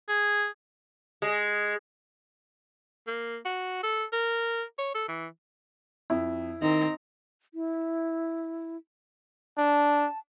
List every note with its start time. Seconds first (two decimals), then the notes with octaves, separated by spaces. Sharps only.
0.09 G#4
1.22 G#3
3.07 A#3
3.45 F#4
3.83 A4
4.13 A#4
4.78 C#5
4.95 A4
5.08 E3
6.10 F2 E4
6.62 D#3 C4 D#4 A#5
7.54 E4
9.58 D4 A5